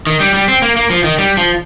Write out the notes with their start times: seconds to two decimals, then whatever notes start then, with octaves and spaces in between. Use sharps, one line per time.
0.07 D#3
0.20 G3
0.34 G3
0.48 C4
0.62 A#3
0.76 A#3
0.90 F3
1.04 D#3
1.18 G3
1.37 F3